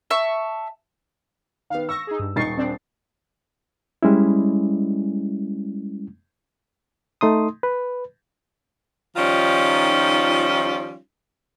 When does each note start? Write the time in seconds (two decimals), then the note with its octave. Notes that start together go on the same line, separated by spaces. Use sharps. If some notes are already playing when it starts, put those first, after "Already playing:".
0.11 E5 A5 C#6
1.70 D#3 B3 F5
1.89 C#6 E6 A#6
2.07 D#4 G#4
2.19 G2
2.36 D#1 D#4 C#6 A6 C7
2.58 C4 D4
4.03 G3 G#3 C#4 E4
7.21 A3 D#4 C6 D#6
7.63 B4
9.16 D#3 F3 G3 C#4 D#4 F4